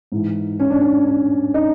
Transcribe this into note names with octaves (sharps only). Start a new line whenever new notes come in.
G#2 E3
C#4
D4
C#4
D4
D#4